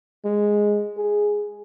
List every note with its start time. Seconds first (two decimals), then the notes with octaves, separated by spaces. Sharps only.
0.25 G#3
0.97 G#4